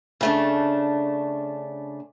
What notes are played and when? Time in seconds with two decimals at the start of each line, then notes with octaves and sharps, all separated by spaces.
0.21 C#3 A3 D4